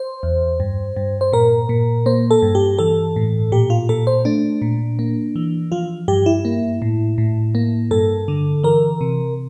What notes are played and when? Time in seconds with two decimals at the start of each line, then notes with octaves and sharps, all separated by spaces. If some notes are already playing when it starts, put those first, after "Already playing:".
Already playing: C5
0.23 E2
0.60 G2
0.97 G2
1.21 C5
1.33 A#2 A#4
1.69 A#2
2.06 A#3 C5
2.31 A4
2.42 G2
2.55 G4
2.79 E3 A4
3.16 A2
3.52 A#2 G4
3.70 F4
3.89 A#2 A4
4.07 C5
4.25 A3 D4
4.62 A#2
4.99 A#3
5.36 E3
5.72 F3 F4
6.08 G2 G4
6.26 E4
6.45 A#3
6.82 A2
7.18 A2
7.55 A#3
7.91 G2 A4
8.28 D3
8.63 E3 A#4
9.01 C3